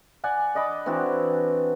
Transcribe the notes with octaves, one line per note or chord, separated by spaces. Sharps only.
D5 F#5 G#5
D5 D#5 B5 D6
E3 C4 D4 F#4